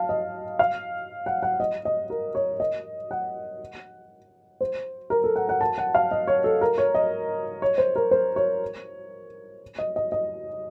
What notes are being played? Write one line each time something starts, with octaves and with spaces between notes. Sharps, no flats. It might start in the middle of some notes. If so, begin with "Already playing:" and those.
Already playing: F5 A5
D#5
F5
F#5
F#5
D#5
D#5
A#4
C#5
D#5
F#5
C5
A#4
A4
F#5
F#5
A5
F#5
F5
D#5
C#5
A4
A#4
C#5
D#5
C#5
C5
A#4
C5
C#5
D#5
D#5
D#5